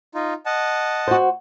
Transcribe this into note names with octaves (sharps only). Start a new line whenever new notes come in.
D#4 F4
D#5 F#5 A5
F#4 C5